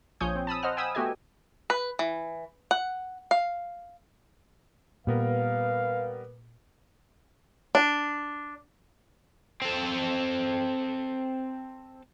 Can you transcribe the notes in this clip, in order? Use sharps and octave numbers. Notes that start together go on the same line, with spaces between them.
A#1 F3 C#5 G#5 D#6 G6
C4
A5 B5 D#6 E6
C5 D#5 F#5 F6
G5 G#5 B5 D#6 E6
A3 B3 F#4 G4 D#5 G#5
B4
E3
F#5
F5
A#2 G3 B3 A#4 B4 F5
D4
C4 A4